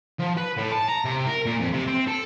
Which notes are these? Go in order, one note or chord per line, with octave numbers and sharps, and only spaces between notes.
F3
B4
A2
A5
A#5
C3
A#4
A#2
F2
C3
C4
A4